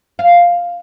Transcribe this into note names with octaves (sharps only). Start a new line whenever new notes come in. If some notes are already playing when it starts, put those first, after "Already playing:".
F5